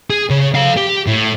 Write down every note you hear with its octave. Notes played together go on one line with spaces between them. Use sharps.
G#4
C#3
A4 F5
G4
A2